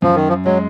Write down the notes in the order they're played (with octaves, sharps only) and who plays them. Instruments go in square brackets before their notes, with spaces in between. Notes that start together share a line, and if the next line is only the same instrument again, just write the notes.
[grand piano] F#2 [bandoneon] F3
[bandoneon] D#3
F3
[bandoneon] F#3 [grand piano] G#3